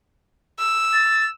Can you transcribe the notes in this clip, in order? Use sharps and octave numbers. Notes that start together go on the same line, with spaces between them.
E6
A6